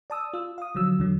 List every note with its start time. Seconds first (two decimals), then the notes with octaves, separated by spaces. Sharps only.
0.10 D5 A5 D#6 E6
0.34 F4 E6
0.58 F5 D#6
0.75 D3 F3 F#3 E6
0.99 E2 D3 F#3